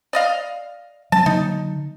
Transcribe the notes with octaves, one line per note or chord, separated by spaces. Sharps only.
D5 D#5 F5
F#3 G#3 C#4 A5
D3 F#3 A#3 D#4